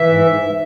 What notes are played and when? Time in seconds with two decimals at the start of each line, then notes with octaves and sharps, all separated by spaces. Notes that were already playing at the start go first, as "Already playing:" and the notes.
Already playing: E3 E5
0.09 G#2
0.25 G#2